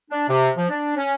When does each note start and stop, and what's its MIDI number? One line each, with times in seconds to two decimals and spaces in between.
0.11 0.25 62
0.28 0.50 48
0.56 0.66 53
0.70 0.94 62
0.96 1.14 61